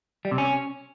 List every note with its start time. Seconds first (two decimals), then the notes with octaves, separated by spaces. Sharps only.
0.25 G3
0.31 C3
0.38 C#4